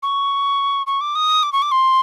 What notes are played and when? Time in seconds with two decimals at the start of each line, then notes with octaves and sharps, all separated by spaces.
0.03 C#6
0.87 C#6
1.01 D6
1.15 D#6
1.43 D6
1.53 C#6
1.62 D6
1.71 C6